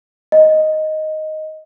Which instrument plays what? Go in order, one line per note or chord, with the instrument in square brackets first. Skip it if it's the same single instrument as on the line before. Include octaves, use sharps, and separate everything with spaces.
[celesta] D#5